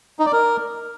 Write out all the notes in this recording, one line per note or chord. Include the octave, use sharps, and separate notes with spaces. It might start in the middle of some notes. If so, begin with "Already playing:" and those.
D#4
D5
A#4